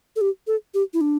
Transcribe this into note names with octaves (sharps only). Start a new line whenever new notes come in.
A4
G4
A4
G4
E4
D4